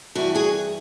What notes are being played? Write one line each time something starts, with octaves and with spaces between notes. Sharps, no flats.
G2 E3 E4 F#4
F#4 G#4